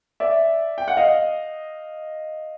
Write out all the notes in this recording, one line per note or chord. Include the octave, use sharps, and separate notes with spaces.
D5 E5
G5
F#5
D#5 F5